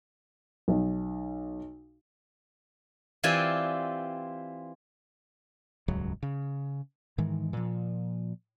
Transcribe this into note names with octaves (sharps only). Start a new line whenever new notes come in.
B1
E3 C4 F4 G4 D5 G#5
D#1 C#2 G#2 F#3
C#3
G#2 D#3 E3 G#3
A#2 F3